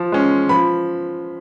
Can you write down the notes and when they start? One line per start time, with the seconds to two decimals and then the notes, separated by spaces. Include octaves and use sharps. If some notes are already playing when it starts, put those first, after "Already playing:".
Already playing: F3
0.12 G#3 C#4
0.49 F3 B5